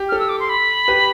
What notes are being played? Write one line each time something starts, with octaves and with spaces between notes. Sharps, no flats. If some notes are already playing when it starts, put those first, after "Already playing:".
Already playing: G4
A4 F6
E6
D6
C6
B5
G4 B4